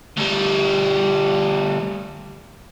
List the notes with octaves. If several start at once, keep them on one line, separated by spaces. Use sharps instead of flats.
D2 G3